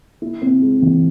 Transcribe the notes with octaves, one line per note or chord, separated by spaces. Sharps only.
E4
C4
G#3
E3